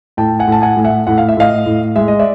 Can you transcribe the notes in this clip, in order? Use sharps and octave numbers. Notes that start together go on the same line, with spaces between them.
A2 G5 A5
F#5 G#5
A2 A5
F#5 G#5
A2
E5 F#5
A2 F#5
F5
E5
A2 D#5 F5
A2
G#3 E5
D#5
D5 E5